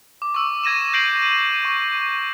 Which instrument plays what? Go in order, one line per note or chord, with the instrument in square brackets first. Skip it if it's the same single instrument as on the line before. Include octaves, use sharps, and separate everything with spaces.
[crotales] D6
C#6 E6
D6 G#6 A#6 D#7 E7
G6 A#6 C7 D7 D#7 F#7
D#7
C#6